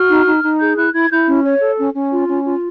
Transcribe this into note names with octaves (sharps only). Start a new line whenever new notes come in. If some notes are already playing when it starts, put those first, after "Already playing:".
Already playing: F#4 F6
D#4
D#4
D#4
G#4 G6
E4 F#6
E4 G#6
E4 G6
C#4
C#5
A4
C#4
C#4
F4
C#4
F4